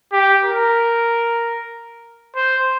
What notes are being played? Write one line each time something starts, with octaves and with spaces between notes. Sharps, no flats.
G4
A#4
C5